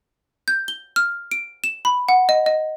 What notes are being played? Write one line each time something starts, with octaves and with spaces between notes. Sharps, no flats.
G6
G7
F6
D7
E7
B5
F#5
D#5
D#5